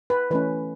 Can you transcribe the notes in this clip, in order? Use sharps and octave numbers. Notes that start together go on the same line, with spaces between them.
B4
E3 A3 C#4 B4